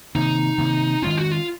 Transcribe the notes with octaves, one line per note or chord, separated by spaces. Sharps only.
C3 D#3 A#3 D#4
C3 D#3 A#3
D#3 G#3 C#4 F4
F#4
F4